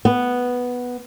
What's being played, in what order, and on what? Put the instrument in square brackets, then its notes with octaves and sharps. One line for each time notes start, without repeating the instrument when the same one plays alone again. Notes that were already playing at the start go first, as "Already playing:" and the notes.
[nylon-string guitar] B3